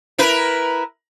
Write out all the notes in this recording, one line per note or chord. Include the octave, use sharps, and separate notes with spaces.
E4 A#4 B4